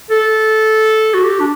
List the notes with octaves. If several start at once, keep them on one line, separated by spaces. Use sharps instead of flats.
A4
F#4
G4
D4